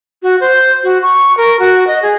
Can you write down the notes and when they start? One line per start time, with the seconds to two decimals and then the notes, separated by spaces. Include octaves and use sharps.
0.23 F#4
0.40 C5
0.83 F#4
1.02 C#6
1.37 A#4
1.59 F#4
1.87 D#5
2.02 G#4